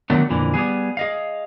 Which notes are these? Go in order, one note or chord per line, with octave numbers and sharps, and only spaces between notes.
D3 D#3 F#3 A3 B3
F2 A#2 D3 E3
G3 B3 G#4
G#4 D#5 F5